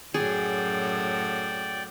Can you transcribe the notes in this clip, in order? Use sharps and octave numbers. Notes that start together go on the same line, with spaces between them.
F#2 A2 F#4 G#4 D5 G5